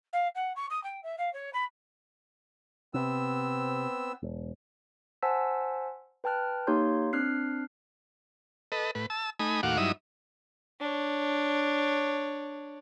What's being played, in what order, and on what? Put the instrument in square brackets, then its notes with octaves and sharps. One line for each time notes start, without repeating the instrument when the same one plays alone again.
[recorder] F5
F#5
C#6
D#6
G5
E5
F5
C#5
B5
[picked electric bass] C3 [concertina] B3 C4 E6
[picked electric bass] E1
[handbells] C5 F#5 G#5 A5 E6 B6
B4 G5 A5 F6 F#6
A#3 D#4 G4 C#5 C6 G6
C4 D4 F6 F#6 C7
[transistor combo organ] A4 B4 D#5
A2 B4
A5 E6
A3 D#4 G#5 B5 D#6
D#2 A2 F#4 F5 F#5 D6
G2 F#3 D#4 E4 E5 D#6
[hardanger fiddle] D4 C#5